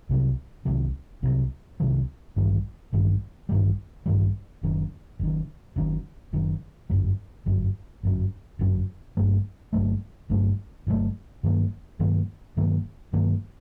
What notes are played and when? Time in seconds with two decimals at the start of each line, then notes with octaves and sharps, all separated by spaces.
0.09 C2 C3 D#3 F#3
0.65 C2 C3 D#3 F#3
1.23 C2 C3 D#3 F#3
1.80 C2 C3 D#3 F#3
2.37 A1 G2 D#3 G3
2.93 A1 G2 D#3 G3
3.49 A1 G2 D#3 G3
4.06 A1 G2 D#3 G3
4.63 F#1 F#2 D#3
5.20 F#1 F#2 D#3
5.76 F#1 F#2 D#3
6.33 F#1 F#2 D#3
6.90 G1 F#2 F#3
7.46 G1 F#2 F#3
8.03 G1 F#2 F#3
8.59 G1 F#2 F#3
9.17 G1 G2 F#3 A3
9.73 G1 G2 F#3 A3
10.30 G1 G2 F#3 A3
10.87 G1 G2 F#3 A3
11.43 G2 D#3 F#3 A#3
11.99 G2 D#3 F#3 A#3
12.57 G2 D#3 F#3 A#3
13.13 G2 D#3 F#3 A#3